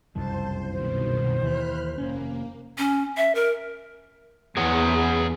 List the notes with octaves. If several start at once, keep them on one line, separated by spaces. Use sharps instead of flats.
F#1 C2 F2 C5 A5
B2 D#3 C5
D#2 E3 B5 F6 F#6
F1 A#3 C#4
C#4
E5
A#4
E2 G#4 C#5 F#5